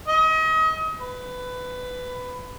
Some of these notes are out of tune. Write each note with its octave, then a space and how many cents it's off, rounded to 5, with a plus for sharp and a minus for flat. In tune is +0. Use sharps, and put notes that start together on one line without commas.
D#5 +35
B4 +15